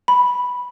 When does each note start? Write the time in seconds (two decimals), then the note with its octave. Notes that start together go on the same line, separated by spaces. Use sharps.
0.08 B5